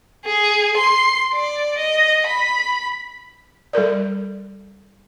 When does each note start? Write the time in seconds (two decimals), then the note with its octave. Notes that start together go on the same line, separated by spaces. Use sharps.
0.26 G#4
0.77 C6
1.34 D5
1.79 D#5
2.27 B5
3.73 G3 A4 A#4 D5